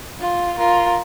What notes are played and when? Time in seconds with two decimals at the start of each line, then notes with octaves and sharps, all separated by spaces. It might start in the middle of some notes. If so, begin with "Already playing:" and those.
0.20 F4
0.58 F4 A#4